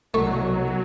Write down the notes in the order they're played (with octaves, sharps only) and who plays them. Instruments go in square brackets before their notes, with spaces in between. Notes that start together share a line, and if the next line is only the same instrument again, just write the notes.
[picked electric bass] C2 B2 [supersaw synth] F#3 [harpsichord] A3